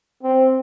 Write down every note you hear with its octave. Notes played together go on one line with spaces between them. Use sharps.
C4